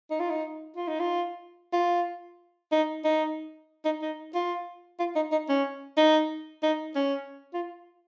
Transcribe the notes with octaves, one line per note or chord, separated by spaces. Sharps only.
D#4
F4
D#4
F4
D#4
F4
F4
D#4
D#4
D#4
D#4
F4
F4
D#4
D#4
C#4
D#4
D#4
C#4
F4